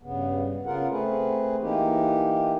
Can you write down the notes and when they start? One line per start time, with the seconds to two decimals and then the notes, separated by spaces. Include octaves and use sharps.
0.03 G2 C#3 B3
0.66 C#3 B3 F4 A#4 F#5
0.90 A3 C4 G#4 B4
1.60 E3 A#3 D#4 G4